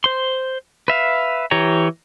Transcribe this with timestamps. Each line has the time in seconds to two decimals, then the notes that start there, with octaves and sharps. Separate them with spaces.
0.04 C5 C6
0.88 B4 E5 F5
1.51 E3 G4 C#5 A#5